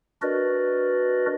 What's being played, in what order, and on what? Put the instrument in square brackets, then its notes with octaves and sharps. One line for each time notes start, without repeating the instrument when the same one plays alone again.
[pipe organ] D4 F#4 A#4 B4 D5 D#5